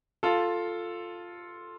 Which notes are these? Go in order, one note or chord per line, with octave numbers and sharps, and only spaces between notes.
F4 A4